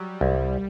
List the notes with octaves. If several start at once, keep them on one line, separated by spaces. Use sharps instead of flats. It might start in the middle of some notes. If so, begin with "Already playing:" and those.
Already playing: F#3 G3
C2